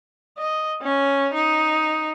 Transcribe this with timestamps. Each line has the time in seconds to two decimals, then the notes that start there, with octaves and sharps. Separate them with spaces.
0.38 D#5
0.82 C#4
1.34 D#4